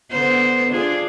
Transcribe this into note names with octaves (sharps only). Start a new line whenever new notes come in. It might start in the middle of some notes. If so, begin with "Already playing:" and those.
D3 B3 C5
D4 F4 G#4